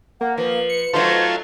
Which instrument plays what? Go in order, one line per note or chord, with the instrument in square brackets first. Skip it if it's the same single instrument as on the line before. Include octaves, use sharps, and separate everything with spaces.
[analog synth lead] A#3 [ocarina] F#5
[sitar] F3 [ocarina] B4
[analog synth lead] C#7
[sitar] F#3 A3 D#4 [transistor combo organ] F4 A4 [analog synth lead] C5